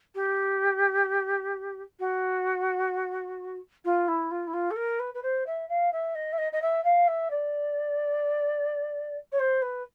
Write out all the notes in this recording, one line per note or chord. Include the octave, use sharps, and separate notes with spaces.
G4
F#4
F4
E4
F4
E4
F4
A4
A#4
B4
B4
C5
E5
F5
E5
D#5
E5
D#5
D#5
E5
F5
E5
D5
C#5
C5
B4